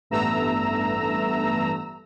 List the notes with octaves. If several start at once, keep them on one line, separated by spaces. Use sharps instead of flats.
A1 G2 A3 B3 A#5 E6